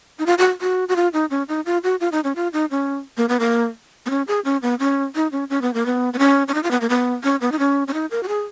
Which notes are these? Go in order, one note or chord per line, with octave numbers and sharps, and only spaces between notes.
D#4
F4
F#4
F#4
F#4
F4
D#4
C#4
D#4
F4
F#4
F4
D#4
C#4
F4
D#4
C#4
A#3
B3
A#3
B3
C#4
G#4
C#4
B3
C#4
D#4
C#4
C#4
B3
A#3
B3
B3
C#4
C#4
D#4
F4
B3
A#3
B3
C#4
B3
D#4
C#4
C#4
D#4
A#4
F#4
G#4